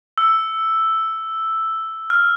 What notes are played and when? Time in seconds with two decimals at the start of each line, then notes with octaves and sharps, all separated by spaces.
0.18 E6
2.10 F6